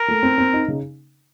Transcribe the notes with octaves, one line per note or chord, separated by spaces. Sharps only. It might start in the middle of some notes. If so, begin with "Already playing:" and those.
Already playing: A#4
A3
C4
C4
D#4
C#3